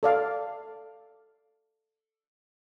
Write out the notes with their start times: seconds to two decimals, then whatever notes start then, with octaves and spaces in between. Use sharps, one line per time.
0.03 A4 D5 F5